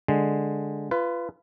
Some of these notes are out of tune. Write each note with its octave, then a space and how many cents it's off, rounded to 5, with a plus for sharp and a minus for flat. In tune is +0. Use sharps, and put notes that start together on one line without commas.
D3 +0 G#3 +0
F4 -25 B4 +10